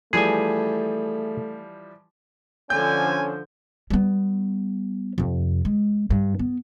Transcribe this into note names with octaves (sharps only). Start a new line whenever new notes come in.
E3 F3 G3 A3 G#4 G#5
D3 F3 C#4 G#5 G6
G3 B3
F2 C3
G#3
G2
B3